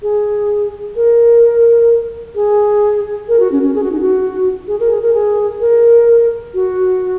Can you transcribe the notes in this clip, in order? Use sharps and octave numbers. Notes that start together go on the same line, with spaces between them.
G#4
A#4
G#4
A#4
F#4
C#4
C#4
G#4
F#4
D#4
F#4
G#4
A#4
G#4
A#4
G#4
A#4
F#4